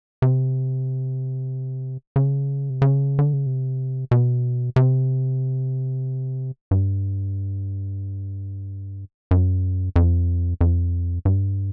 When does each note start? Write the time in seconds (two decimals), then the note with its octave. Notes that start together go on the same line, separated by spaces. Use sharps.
0.22 C3
2.16 C#3
2.70 C3
2.82 C#3
3.19 D3
3.33 C#3
3.46 C3
4.11 B2
4.76 C3
6.71 G2
9.31 F#2
9.96 F2
10.61 F2
11.25 G2